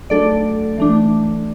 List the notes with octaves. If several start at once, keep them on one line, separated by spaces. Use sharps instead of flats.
F#3 A3 D4 A4 D5
E3 A3 D4